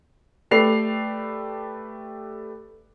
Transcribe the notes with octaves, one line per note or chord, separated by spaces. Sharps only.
A3 G4 B4 D5 C7 F7